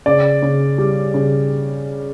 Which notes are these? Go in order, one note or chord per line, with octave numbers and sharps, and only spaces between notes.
C#3 D5
C#3
G3
C#3